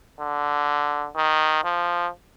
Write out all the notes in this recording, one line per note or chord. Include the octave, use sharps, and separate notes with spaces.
D3
D#3
F3